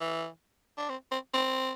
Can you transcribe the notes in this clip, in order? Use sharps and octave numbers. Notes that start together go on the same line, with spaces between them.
E3
D4
C4
C4
C4